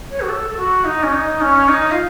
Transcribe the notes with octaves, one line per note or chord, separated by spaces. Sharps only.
C#5
F#4
A4
A4
F#4
D#4
C#4
D#4
C#4
D#4
F4